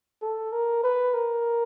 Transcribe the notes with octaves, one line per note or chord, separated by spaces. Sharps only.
A4
A#4
B4
A#4